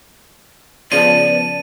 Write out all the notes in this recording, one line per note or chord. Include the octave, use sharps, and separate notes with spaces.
C#3 F3 B3 B4 D5 A5 D#7